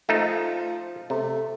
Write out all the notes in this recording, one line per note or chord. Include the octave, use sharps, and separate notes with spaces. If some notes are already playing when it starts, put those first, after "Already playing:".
F3 A3 D#4
C3 A3